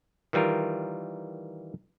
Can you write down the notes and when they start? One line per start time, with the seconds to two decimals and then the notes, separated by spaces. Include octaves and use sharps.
0.33 D#3 E3 G3 F4 A#4